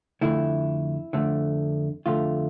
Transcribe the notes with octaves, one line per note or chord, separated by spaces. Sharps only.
F2 D3 A3 E4
F2 D3 A3
F2 D3 A3 F4